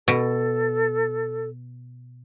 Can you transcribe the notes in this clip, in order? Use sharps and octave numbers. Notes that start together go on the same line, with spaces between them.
B2 A4